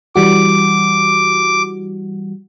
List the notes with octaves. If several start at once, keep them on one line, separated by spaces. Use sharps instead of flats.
E3 G3 F#4 D6